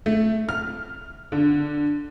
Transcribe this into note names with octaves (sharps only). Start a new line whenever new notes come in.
A3
F6
D3